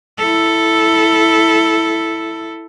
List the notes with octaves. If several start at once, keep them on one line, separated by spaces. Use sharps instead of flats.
E4 A4